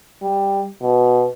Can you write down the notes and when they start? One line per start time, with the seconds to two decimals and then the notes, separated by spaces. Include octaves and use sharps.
0.22 G3
0.82 B2